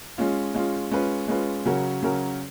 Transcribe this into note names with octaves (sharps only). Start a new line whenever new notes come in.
G#3 C#4 F4
G#3 C#4 F4
G#3 C#4 F4 B4
G#3 C#4 F4 B4
C#3 F#3 C#4 F#4 A#4
C#3 F#3 C#4 F#4 A#4